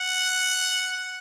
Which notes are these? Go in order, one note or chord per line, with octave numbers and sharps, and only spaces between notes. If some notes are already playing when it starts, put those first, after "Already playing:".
Already playing: F#5